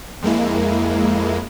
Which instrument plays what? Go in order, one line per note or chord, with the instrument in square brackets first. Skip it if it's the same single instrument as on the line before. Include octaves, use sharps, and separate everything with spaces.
[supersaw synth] F2 G#3 A#3 E4